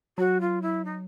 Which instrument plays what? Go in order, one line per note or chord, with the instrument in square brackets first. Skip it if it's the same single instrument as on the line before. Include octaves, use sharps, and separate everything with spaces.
[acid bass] F#3 [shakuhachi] F#4
[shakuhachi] F4
E4
D#4